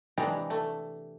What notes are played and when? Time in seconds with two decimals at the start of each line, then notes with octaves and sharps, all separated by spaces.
0.18 C3 E3 G#3 D4 G4 A#5
0.50 A3